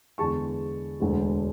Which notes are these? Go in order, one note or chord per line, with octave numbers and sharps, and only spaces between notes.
E2 D3 G#3 A5 C#6
E1 D2 D3 G#3